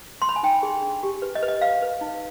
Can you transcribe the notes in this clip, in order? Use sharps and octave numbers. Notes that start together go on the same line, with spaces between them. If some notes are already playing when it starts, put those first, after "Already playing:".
C6
B5
G#5
D#4 G5
G#4
D4
G4
B4
D#5
B4
D#5
B4 F5
B4
D#4